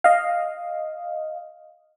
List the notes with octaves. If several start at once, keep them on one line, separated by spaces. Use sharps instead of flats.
D#5 F5